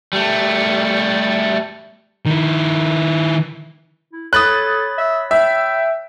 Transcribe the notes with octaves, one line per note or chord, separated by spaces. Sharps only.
G3 A3
D#3 E4
E4
A4 C#5 B5 D#6 F#6 A6
E5
E5 G5